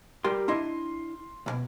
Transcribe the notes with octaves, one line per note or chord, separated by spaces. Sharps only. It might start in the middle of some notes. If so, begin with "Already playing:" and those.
G3 G4 A#4 C6
D4 E4 D#5 C6
C#2 B2